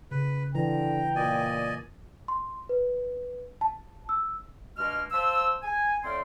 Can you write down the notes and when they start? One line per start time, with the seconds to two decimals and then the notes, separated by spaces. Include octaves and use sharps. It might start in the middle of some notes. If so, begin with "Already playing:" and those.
0.11 C#3 B4
0.55 D3 E3 G5 A#5
1.16 A#2 D5 D#5 G#5
2.28 C6
2.69 B4
3.61 A5
4.09 E6
4.77 G2 B2 G#3 A#3 F6
5.12 C5 F5 A5 E6
5.62 G#5
6.03 A2 C4 D5 F5 G5 C6